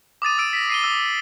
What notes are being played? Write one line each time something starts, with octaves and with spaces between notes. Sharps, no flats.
D6 D#6 A6 D#7
E6 D7 D#7
A#6 B6
C7 D#7 G7
D#6 E6 D#7